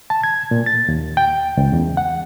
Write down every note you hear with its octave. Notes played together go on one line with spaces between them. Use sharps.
A5
G#6
A#2
A6
D#2
G5
C#2
E2
F#5